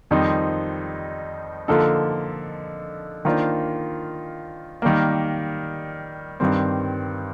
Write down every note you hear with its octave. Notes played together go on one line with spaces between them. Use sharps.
F2 D#3 G3 C4 D#4
D3 F3 A#3 D#4 A4
D#3 A#3 D4 F4 C5
D#3 G3 A#3
G2 D#3 G3 C4